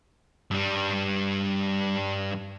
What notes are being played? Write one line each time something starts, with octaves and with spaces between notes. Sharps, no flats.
G2 G3